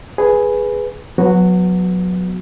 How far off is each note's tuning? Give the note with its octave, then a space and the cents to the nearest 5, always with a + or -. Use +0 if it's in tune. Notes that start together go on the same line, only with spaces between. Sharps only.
G#4 +0 B4 +0
F#3 -25 B3 +0 F#4 +0